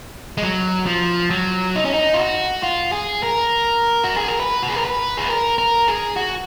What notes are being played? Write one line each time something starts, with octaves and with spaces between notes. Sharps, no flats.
G#3
F#3
F3
F#3
D#4
C#4
D#4
F4
F#4
F4
G#4
A#4
F#4
G#4
A#4
B4
F#4
G#4
A#4
B4
G#4
A#4
A#4
G#4
F#4